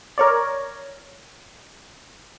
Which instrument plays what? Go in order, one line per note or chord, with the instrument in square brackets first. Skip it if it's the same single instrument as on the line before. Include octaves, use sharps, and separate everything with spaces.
[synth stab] A#4 C#5 D5